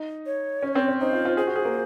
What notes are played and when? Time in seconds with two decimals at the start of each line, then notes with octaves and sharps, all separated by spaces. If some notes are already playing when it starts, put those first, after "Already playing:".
Already playing: D#4
0.26 C#5
0.63 C#4
0.75 C4
0.88 C#4
1.00 D#4 C5
1.13 F4
1.25 F4
1.37 G#4 C5
1.47 F#4
1.56 G#4
1.65 A#3